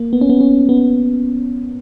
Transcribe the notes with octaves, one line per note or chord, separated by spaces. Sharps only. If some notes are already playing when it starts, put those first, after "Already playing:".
Already playing: A#3
B3
C#4
B3
C#4
B3